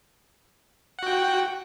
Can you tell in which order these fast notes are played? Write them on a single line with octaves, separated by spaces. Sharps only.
F#5 F#4 G5